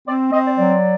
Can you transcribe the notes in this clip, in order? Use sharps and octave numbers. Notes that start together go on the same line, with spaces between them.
C4 D5
C4 D#5
D5
F#3 D5